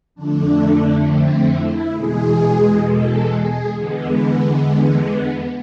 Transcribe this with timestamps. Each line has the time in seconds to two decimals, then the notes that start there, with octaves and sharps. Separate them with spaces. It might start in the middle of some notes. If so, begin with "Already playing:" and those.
0.15 F2 D3 A3 D4
1.06 C4
1.50 E4
1.94 E2 B2 G#3 G#4
2.84 A4
3.28 G#4
3.73 E2 D3 G#3 B3